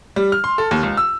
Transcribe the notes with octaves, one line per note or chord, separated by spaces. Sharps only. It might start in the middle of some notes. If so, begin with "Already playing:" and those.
G3
F6
C6
A4
D#2
C#2
E6